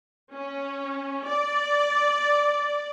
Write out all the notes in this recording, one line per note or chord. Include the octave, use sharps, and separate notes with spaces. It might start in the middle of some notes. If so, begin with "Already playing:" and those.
C#4
D5